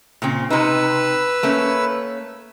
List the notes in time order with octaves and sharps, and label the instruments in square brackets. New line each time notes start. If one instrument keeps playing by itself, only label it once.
[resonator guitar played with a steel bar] A#2 C#3 C4
[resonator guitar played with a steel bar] C3 D#4 [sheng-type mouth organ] B4 E6
[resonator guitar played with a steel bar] A3 A#3 C#4